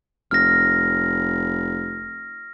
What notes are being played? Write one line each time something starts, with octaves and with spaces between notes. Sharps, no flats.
F1 F6 A#6